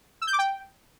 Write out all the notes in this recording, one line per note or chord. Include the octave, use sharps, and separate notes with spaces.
E6
G6
D6
G5